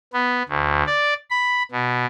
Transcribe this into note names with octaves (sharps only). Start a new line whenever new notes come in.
B3
D2
D5
B5
B2